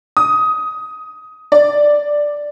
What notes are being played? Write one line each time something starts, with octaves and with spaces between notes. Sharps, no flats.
D#6
D5